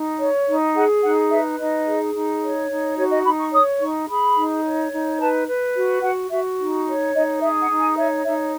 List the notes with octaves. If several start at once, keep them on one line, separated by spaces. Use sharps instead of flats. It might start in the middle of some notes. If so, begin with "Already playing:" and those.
Already playing: D#4
C#5
D#4
G#4 F#5
D#4 F#5
B4 E5
D#4 D#5
G#4
D#4
C#5
D#4
F#4 C#5
D#5
D#4 B5
C#6
C#5 D#6
D#4 C#6
G#4 B5
D#4
C#5
D#4
B4 A5
B4
F#4
F#4 F#5
F#4 E5
D#4
C#5
D#4 D#5
G#4 E5
F#5
D#4
G#5
C#5 E5
D#4 E5